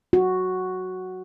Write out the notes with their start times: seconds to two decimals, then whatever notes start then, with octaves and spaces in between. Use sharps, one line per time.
0.13 F#4